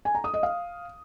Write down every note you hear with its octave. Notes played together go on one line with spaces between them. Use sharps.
G#5
A#5
D#6
D#5
F5